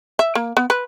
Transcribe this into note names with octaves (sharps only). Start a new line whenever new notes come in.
E5
A#3
B3
B4